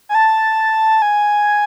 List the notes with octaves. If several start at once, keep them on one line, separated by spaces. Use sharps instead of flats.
G#5
A5
G#5